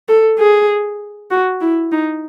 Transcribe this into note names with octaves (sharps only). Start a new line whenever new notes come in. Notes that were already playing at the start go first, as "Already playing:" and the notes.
A4
G#4
F#4
E4
D#4